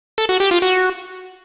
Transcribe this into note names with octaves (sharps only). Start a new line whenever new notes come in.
A4
F#4
G4
F4
F#4